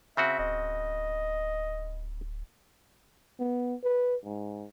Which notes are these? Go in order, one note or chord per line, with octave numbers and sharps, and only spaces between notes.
C#3 C4 F#4 E5
D1 D#5
B3
B4
G#2